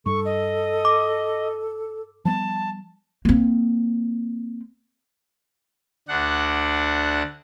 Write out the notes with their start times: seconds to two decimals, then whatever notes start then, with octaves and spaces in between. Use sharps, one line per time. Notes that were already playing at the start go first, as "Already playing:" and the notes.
0.06 G2 G3 A4 C#6
0.25 D#5
0.85 D6
2.25 F3 G3 B3 A5
3.25 A#3 C4
6.08 D2 D4 F#5